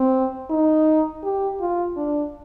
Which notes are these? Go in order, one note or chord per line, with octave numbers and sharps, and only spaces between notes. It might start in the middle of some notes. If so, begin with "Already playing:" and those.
Already playing: C4
D#4
G4
F4
D4